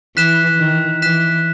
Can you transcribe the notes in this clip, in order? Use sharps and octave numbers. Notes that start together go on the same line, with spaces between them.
E3 F#6 B6 E7
D#3
E3 F#6 B6 E7